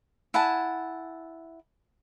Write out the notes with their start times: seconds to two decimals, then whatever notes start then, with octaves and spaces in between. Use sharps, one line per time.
0.34 E4 F#5 G#5 A5